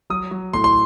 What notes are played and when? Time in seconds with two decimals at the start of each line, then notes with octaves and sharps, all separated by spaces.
0.10 F#3 D#6
0.31 F#3
0.53 A2 C6
0.64 C6